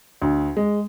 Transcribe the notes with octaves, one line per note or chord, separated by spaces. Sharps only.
D2
G#3